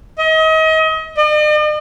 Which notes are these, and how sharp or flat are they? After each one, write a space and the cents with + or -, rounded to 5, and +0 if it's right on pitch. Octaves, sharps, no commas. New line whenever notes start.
D#5 +35
D#5 -45